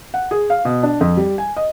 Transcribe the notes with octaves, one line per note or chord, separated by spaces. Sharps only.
F#5
G#4
F5
B2
D4
F2
G3
G#5
D#5